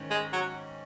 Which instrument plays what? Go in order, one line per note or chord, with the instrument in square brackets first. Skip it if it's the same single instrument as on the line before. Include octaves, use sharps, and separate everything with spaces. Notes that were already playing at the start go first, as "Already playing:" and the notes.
Already playing: [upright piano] G#2 D#3 C#4
[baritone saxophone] G#3
F#3